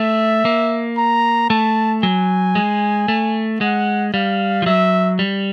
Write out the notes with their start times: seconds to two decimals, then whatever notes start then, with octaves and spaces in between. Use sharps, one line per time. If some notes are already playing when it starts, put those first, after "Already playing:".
Already playing: A3 E5
0.45 A#3
0.98 A#5
1.50 A3 A5
2.03 F#3 G#5
2.55 G#3
3.08 A3
3.61 G#3 F#5
4.14 G3 F5
4.62 F3
4.66 F#3 E5
5.19 G3